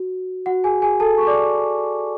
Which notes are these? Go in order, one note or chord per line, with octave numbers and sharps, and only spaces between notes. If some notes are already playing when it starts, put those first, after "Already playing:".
Already playing: F#4
F#4 F#5
G#4 G#5
G#4 G#5
A4 A5
C#6
D5 D6